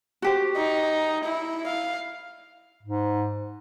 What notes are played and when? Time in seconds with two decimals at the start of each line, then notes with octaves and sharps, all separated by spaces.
0.22 F#4 G4 C5
0.56 D#4
1.24 E4
1.67 F5
2.83 G#2